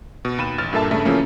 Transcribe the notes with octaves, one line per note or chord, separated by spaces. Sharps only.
B2
D#2 B5 D#7 E7
A1 F6 A6
G2 A#2 A#3 A4 E5 A5
G2 C#3 A3 E5
C#3 E3 F3 A3 A#3 C#4